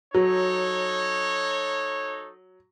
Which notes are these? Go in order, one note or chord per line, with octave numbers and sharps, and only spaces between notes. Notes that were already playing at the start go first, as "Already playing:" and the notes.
F#3 D#4 A4 C#5